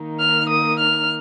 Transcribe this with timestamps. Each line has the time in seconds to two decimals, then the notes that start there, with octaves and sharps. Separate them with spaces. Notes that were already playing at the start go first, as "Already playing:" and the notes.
Already playing: D#3 A#3 D#4
0.19 F6
0.49 D#6
0.80 F6